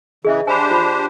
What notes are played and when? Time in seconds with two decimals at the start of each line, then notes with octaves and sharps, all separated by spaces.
0.25 C#3 E3 G#4 D#5 E5
0.47 D4 G4 C5 G#5 B5
0.71 F4 B5